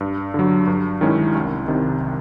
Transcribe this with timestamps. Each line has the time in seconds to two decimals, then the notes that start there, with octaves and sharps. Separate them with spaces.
0.01 G2
0.34 D3 F#3
0.67 G2
1.01 D#3 G#3 C#4 E4
1.35 C2
1.68 C3 D#3